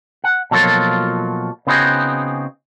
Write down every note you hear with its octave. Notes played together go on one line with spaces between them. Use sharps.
F#5
B2 F3 F#3 A#3 F4 A4
C#3 B3 C4 D#4 F#4 G#4